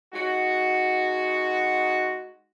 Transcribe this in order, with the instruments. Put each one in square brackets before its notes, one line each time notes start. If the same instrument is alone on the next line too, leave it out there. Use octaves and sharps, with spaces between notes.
[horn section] G#3 D#4 F#4